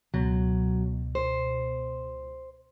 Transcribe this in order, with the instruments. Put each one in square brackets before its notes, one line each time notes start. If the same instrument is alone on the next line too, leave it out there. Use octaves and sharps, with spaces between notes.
[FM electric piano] C#2 B2 [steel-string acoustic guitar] F#3
[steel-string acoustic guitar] C5